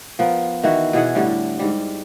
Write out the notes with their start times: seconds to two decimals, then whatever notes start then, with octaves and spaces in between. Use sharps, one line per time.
0.19 F3 B3 A#4
0.63 D#3 E3 E4 F#4
0.93 B2 E3 G#4 F#5
1.15 A2 D3 G3
1.59 G#2 G3